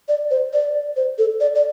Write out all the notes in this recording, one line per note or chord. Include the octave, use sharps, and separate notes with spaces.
D5
C5
D5
C5
A4
D5
D5